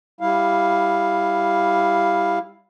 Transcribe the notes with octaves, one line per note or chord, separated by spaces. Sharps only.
G3 E4 F5